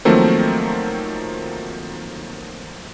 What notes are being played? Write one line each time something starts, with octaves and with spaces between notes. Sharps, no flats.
D#3 F3 F#3 A3 A#3 C4